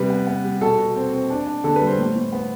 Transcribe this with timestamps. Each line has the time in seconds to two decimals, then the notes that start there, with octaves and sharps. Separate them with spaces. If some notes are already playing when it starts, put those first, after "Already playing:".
Already playing: C3 G3 B4
0.10 B3
0.27 B3
0.44 G3
0.61 B2 A4
0.78 B2
0.96 C4
1.13 C4
1.30 D4
1.47 D4
1.64 D3 A4
1.76 B4
1.81 G3
1.87 C5
1.98 A2
2.16 A2
2.33 B3